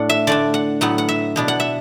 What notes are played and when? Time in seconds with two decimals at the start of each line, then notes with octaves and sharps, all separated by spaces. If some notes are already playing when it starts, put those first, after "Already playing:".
Already playing: A2 A3 D4 F#5
0.09 E5
0.27 D3 A3 D4 D5
0.54 F#5
0.81 A2 F#3 B3 F#5
0.98 F#5
1.09 E5
1.36 B2 B3 D4
1.48 F#5
1.60 E5